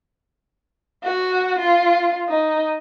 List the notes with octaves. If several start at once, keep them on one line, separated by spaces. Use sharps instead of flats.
F#4
F4
D#4